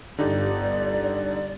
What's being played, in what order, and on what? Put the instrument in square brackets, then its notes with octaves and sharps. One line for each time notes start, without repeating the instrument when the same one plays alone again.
[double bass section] G1 G2 [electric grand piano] D3 D#4 G4 [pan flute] D5